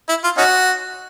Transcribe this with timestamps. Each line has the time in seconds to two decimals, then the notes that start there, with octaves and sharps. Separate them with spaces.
0.08 E4
0.23 F4
0.38 C#4 D#4 F#4